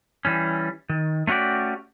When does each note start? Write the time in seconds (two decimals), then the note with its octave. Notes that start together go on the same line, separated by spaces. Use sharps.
0.25 E3 G3 C#4
0.89 D#3
1.27 A3 C#4 F#4 G4 D5